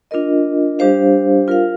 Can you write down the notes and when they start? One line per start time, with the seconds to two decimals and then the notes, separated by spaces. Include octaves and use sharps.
0.11 D4 F4 A#4 D#5
0.79 G3 D4 G4 C5 F5
1.48 F4 A#4 F5